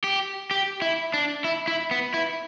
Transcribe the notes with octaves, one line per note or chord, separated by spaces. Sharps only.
G4
G4
E4
D4
E4
E4
B3
E4